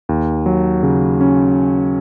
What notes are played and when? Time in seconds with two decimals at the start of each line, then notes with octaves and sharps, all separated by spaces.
0.09 D#2
0.46 F#3
0.83 C#3
1.21 C#4